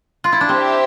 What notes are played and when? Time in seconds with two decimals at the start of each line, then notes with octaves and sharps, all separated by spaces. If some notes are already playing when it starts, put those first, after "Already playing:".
0.24 F4
0.32 E4
0.41 D4
0.49 C4 G4 C5 E5